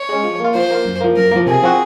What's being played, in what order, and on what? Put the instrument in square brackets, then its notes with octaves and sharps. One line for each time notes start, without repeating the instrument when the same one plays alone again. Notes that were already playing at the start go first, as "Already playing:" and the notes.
Already playing: [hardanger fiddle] C#5
[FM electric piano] G#3 C#4
F3
A#3 F4
[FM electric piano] F3 [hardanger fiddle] C5
[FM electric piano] A#3 F4
F#2
F3 A#3
[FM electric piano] F#2 [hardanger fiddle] A#4
[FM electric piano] F3 A#3
[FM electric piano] C3 [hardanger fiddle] G#4
[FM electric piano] F3 C4 F#4